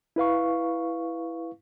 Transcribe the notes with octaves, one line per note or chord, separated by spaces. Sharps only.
E4 B4 F5 C#6